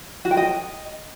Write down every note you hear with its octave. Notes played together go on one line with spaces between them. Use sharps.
F#4
G5
D#5